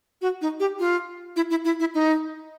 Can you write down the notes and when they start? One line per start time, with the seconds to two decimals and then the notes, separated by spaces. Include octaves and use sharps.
0.22 F#4
0.41 D#4
0.60 G4
0.79 F4
1.36 E4
1.50 E4
1.65 E4
1.80 E4
1.94 D#4